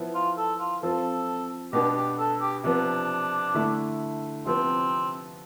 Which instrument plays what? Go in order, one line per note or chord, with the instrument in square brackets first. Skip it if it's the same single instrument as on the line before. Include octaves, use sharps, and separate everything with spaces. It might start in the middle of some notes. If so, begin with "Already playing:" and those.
Already playing: [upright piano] F3 B3 E4
[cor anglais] F4
A4
F4
[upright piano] F3 C4 F4 [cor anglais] A4
[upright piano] B2 B3 D4 [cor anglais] G4
[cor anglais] G4
A4
G4
[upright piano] C3 F3 B3 [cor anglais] D4
[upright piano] D3 A3 E4
[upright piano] C3 F3 B3 [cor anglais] C4